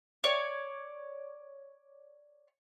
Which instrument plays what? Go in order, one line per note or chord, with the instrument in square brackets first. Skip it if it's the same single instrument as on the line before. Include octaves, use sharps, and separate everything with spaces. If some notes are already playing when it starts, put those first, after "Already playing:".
[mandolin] C#5 D5